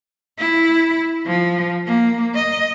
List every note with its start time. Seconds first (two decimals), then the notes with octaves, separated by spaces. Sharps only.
0.38 E4
1.27 F3
1.87 A#3
2.35 D#5